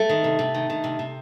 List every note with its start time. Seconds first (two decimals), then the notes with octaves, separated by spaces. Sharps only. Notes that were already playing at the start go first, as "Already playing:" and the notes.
Already playing: A3
0.09 D#3
0.24 C3
0.39 C3
0.54 D#3
0.70 D#3
0.84 C3
0.99 C3